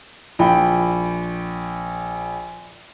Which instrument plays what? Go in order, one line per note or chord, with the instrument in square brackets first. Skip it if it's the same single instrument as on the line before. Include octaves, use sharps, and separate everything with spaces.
[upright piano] A#1 G5 B5